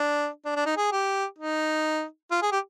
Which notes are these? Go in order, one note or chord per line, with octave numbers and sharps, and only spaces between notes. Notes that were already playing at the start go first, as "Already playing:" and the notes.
Already playing: D4
D4
D4
D#4
G#4
G4
D#4
F4
G#4
G4